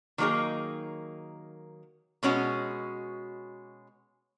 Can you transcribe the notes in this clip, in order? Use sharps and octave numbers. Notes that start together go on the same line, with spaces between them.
D#3 F#3 A#3 D#4 G#4
B2 G#3 C#4 F#4